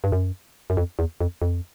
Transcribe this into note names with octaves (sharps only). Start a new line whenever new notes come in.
G2
F#2
F#2
F2
E2
F2
F2